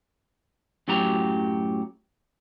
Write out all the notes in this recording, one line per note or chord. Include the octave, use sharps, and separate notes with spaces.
F#2 A2 F#3 F#4 G4 A#5